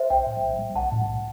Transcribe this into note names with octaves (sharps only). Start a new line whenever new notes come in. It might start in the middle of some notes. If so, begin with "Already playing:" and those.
Already playing: C5 E5
B1 E5 G5
A2
B1
G3
B1 F#5 A5
A2
A2